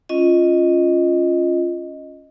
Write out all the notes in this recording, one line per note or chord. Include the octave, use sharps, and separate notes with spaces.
C#4 F4 D#5